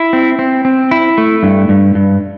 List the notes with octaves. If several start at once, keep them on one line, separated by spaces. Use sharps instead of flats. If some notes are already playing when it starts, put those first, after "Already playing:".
Already playing: E4
C4
C4
C4
E4
A3
G2
G2
G2